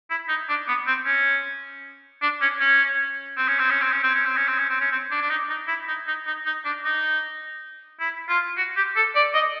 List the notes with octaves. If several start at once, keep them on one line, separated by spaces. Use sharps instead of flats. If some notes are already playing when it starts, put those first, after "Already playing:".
E4
D#4
D4
B3
C4
C#4
D4
C#4
C#4
C4
C#4
C4
C#4
C4
C#4
C4
C#4
C4
C#4
C4
C#4
C4
C#4
C4
D4
D4
D#4
D#4
E4
D#4
D#4
D#4
D#4
D4
D#4
E4
F4
F#4
G4
A4
D5
D#5